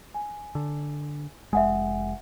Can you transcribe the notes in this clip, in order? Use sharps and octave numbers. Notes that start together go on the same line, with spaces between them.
G#5
D3
F1 G#3 E5 F#5 G#5